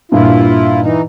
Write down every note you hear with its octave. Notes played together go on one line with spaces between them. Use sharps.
G2 A#2 E4 F4
E3 D#4